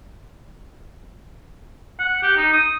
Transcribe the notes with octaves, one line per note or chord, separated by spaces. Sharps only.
F#5
G4
D#4
D#6